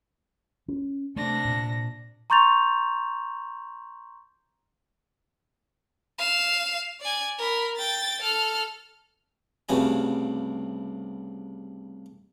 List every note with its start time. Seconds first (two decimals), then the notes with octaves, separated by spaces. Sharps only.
0.68 C#4
1.16 C3 A3 D4 A#6
1.45 A#2
2.30 A#5 C6 C#6 G6 A6 F7
6.19 F5 E7
7.01 D5 G#5
7.39 A#4 B5
7.76 G5 A6
8.22 A4 F6
9.69 C2 G2 C#3 A3 F#4 G#5